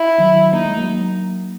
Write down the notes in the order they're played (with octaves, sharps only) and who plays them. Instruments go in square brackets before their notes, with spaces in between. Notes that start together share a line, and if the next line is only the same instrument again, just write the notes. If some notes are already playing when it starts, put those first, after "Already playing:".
Already playing: [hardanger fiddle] E4
[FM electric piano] D#3 F#3
[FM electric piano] A#3 [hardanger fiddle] D#4
[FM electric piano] G#3
F#3 A#3